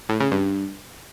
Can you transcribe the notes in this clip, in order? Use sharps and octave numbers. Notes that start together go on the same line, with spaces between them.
A2
C#3
G2